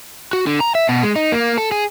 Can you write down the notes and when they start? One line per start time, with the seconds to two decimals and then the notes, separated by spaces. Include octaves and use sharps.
0.33 F#4
0.47 D3
0.60 A#5
0.75 E5
0.89 B2
1.03 G#3
1.16 D#4
1.32 A#3
1.58 A4
1.72 G#4